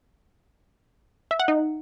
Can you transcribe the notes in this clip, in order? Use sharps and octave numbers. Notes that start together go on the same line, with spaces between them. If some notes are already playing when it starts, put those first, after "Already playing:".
E5
F#5
D#4